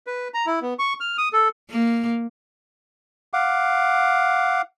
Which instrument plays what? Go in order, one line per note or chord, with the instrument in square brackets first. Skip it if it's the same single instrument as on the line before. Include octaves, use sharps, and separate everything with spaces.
[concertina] B4
A#5
E4
B3
C#6
F6
D#6
A4
[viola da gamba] A#3
[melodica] F5 F#5 D6